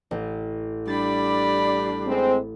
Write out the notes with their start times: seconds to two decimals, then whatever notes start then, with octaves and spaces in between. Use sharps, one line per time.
0.11 A1
0.87 G3 D4 D5 B5 A6
2.08 G#3 C4